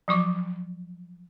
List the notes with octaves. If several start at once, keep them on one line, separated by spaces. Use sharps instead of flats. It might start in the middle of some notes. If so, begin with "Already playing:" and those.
F3 F#3 C#6 D6